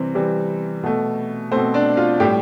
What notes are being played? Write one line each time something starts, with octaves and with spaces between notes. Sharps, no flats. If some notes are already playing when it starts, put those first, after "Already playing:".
Already playing: C3 E3 G3 C4
C3 E3 G3
B2 A3
B2 A3 C4 C5
D4 D5
F4 F5
A2 G3 G4 G5